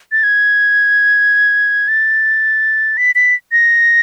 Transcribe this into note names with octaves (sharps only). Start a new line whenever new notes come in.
A6
G#6
A6
B6
B6
A#6